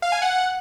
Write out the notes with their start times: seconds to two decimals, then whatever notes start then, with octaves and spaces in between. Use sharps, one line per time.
0.02 F5
0.12 G#5
0.22 F#5